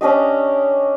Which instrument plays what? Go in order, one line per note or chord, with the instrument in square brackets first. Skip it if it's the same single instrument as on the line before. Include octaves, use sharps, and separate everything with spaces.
[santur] C#4 D4 G4 D#5